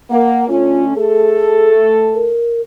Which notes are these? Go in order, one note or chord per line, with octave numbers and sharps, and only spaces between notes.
A#3 F#5
D3 A3 C#4 F4
A3 G#4 A4
A#4